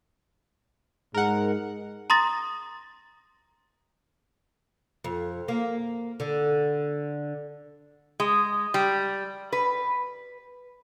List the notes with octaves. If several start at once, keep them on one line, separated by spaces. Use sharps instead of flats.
G#2 G#3 A#4 F#5
A#5 C6 D#6 A6 A#6
F2
A#3
D3
G#3
G3
B4